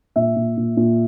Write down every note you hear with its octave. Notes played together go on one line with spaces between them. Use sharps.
A#2 E5
A#2
A#2
A#2